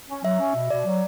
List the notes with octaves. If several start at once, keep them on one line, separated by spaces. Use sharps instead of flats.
C#4
F#3 E5
C#4
B2
B2 D5
F#3